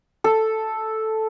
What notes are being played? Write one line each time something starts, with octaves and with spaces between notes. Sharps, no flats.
A4